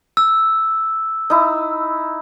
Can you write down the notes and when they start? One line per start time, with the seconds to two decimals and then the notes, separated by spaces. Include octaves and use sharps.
0.17 E6
1.30 D#4 E4